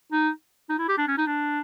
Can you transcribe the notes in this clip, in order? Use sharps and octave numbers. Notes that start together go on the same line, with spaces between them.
D#4
D#4
E4
G4
D4
C#4
D#4
D4